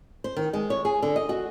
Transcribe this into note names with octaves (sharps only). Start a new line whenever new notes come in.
C5
D#3
G#3
C#5
G#4
D3
D#5
F#4